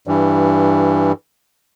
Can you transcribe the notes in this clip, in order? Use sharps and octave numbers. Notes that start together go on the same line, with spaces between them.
G2 E3